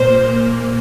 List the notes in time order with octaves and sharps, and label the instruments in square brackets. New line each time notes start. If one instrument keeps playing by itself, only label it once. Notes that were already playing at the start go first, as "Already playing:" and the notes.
Already playing: [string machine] A#2 A#3 [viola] C5